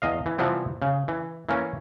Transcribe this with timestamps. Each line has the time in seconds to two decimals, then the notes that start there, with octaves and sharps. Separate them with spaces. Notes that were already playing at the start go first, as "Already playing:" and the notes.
0.02 E2 D#5 F5
0.26 E3
0.38 C3 E3 F3 G3 B3 C4
0.82 C#3
1.08 E3
1.49 E3 A#3 C#4